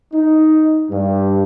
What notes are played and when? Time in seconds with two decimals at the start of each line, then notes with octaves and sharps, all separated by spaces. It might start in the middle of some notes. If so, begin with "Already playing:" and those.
0.13 D#4
0.91 G2